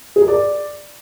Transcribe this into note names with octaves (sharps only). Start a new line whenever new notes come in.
G#4
A#4
D5